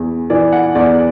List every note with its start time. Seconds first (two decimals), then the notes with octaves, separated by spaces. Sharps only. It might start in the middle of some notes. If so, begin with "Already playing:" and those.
Already playing: E2 E3
0.30 E3 D5
0.53 F#5
0.75 E2 D5